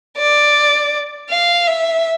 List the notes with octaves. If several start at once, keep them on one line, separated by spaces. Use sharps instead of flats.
D5
F5
E5